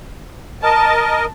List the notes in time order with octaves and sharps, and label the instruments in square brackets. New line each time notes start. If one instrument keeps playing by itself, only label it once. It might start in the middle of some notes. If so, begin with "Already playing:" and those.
[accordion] A#4 D#5 [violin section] A5